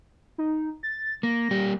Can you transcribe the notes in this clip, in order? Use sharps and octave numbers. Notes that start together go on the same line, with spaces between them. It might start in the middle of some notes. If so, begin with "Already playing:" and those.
D#4
A6
A#3 A#6
G3 A#3 G4